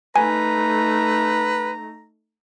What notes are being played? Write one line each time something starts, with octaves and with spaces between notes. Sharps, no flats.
A3 D#4 B4 G#5 A#5